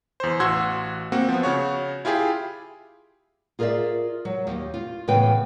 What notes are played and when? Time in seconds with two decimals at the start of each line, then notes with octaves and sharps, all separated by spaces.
0.20 E2 C5
0.40 A1 F#4 C6 E6 G#6
1.12 A#3 C4 F#4
1.29 F3 B3
1.43 C#3 F#4 C#5
2.05 E4 F4 G4 G#4
3.59 F4 G#4 A#4 B4 D5 E5
4.25 F#3
4.47 D#2
4.74 F4
5.08 A2 C#3 E3 B3 B4 G5